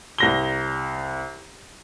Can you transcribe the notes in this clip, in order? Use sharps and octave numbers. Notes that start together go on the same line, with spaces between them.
C2 A#6 G7